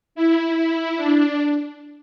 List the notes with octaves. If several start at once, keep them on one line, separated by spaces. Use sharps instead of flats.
E4
E4
D4